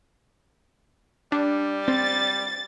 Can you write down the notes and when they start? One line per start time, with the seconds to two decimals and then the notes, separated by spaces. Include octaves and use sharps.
1.32 G3 D4
1.88 C4 A6